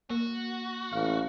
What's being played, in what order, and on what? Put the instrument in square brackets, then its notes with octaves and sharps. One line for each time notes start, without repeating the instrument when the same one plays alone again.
[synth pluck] A#3 [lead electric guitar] F#4
[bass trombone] A1 [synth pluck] F5